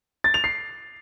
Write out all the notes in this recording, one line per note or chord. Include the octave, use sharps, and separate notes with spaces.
A6
F7
C7